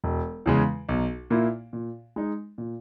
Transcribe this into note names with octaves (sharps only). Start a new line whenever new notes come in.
E1
E2 C#3 G#3
B1
A#2 A#3 E4
A#2
G#3 D#4
A#2